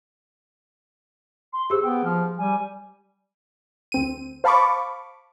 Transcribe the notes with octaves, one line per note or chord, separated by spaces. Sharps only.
C6
G4 G#4 C5 E6
B3 G5
F3 F6
G3 G#5
D2 C4 D#7
C5 F5 A5 B5 C#6 D6